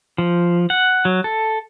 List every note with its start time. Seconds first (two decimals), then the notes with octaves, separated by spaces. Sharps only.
0.18 F3
0.70 F#5
1.05 F#3
1.24 A4